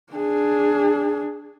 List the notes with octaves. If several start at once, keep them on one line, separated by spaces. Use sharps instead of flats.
D4 G#4